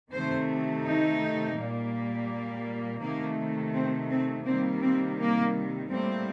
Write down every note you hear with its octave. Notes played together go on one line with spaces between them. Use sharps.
C3 D#3 A3 C5
D#4
A#2 G3 A#3
C3 D#3 A3 A#3
C4
C4
C3 D#3 G3 A#3 C4
C4
A#3
A2 G3 A#3 C4